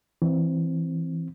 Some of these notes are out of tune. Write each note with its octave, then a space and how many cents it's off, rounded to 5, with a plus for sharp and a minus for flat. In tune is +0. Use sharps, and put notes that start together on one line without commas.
E3 +0 C4 +0